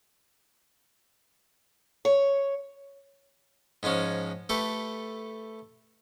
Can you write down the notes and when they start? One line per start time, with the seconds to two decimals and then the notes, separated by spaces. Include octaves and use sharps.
2.05 C#5
3.83 G#2 F3 G#3 C#4
4.49 A3 G4 A4 B4